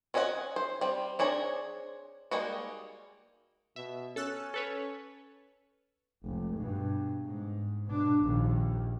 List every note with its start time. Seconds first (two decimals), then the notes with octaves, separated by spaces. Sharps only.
0.14 C4 C#4 F#4 D#5 F#5
0.56 C5
0.81 G3 C4
1.19 C4 D4 G#4 C#5 A#5
2.31 G3 G#3 A#3 D#4 F#4
3.76 B2 E5
4.16 C#4 A4 E6 F#6
4.54 A4 B4 C#5
6.24 F1 C#2
6.56 G2 B2
7.27 G#2
7.86 B2 D4
8.25 A#1 D#2